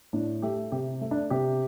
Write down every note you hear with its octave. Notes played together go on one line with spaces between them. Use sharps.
A2 D4
A3 G4
C3 G4
A3
D4
C3 G4